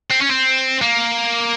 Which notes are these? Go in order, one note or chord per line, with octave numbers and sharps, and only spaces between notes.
C4
C#4
C4
A#3